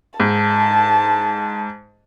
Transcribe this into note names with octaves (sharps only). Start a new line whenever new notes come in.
G#2 A5